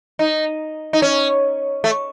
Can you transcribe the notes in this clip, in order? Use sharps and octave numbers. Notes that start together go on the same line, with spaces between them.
D#4
D#4
C#4
A3